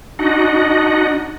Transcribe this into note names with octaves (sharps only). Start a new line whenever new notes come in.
D4 D#4 F#4 D#5 F#5